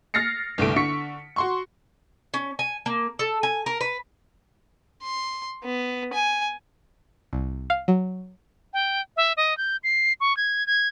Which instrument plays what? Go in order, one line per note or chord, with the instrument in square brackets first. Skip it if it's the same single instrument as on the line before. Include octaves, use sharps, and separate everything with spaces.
[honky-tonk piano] F6 A6 A#6 C7 C#7
G1 C2 A3 D7
D3 C#6 B6 C#7
F#4 C6 C#6
[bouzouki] C#4
G#5
A#3
A4
G#5
A#4
B4
[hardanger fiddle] C6
B3
G#5
[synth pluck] C2
F5
F#3
[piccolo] G5
E5
D#5
G6
C7
C#6
G#6
G#6